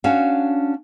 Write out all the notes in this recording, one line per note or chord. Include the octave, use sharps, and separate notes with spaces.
C#4 D4 F#4 F5